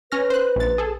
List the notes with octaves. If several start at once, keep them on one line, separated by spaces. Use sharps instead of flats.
C#4 B4 F6 A#6
C5 F#6
A#1 A6
G#4 A4